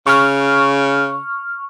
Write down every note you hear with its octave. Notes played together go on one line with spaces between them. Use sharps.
C#3 C#6 F6